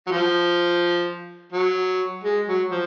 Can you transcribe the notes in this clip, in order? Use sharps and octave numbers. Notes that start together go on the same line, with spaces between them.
F#3
F3
F#3
G#3
F#3
F3